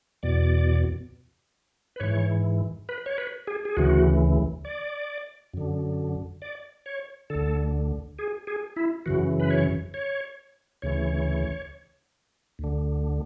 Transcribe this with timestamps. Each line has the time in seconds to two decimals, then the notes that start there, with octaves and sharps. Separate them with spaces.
0.23 E2 B2 D5
1.96 B4
2.00 G#2 E3 C#5
2.89 B4
3.06 C#5
3.18 B4
3.47 G#4
3.65 G#4
3.77 D2 C#3 E3 F#4
4.65 D5
5.54 F#2 D3
6.42 D5
6.86 C#5
7.30 D2 D3 A4
8.19 G#4
8.47 G#4
8.76 E4
9.06 F#2 C#3 E3 F#4
9.40 B4
9.51 C#5
9.94 C#5
10.82 D2 C#3 E3 C#5
12.59 D2 D3